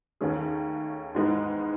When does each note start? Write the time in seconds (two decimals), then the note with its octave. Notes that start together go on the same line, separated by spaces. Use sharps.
0.21 D#2 D#3 A3 C#4 G#4
1.15 G#2 E3 G#3 B3 D#4